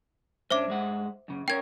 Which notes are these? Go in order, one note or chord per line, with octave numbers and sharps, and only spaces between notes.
G2 C#4 D4 C5 E5 D6
G2 G#3 F#5
F#2 C#3
C#4 A#4 C#5 G5 G#6